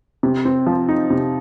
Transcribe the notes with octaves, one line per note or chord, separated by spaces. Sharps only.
C3
C4
F3
D#4
C3